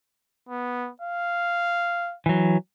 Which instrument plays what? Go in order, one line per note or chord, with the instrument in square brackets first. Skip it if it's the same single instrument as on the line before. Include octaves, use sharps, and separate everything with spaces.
[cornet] B3
F5
[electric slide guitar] E3 F#3